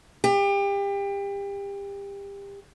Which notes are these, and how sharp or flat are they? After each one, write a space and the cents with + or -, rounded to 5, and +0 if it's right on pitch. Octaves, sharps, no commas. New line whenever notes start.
G4 +30